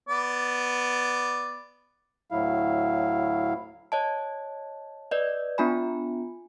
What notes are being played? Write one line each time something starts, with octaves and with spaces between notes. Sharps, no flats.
B3 D5
D2 A2 F#3 E4 F5
C#5 D#5 A5
B4 D5 D#5
B3 D4 F4 G#5 B5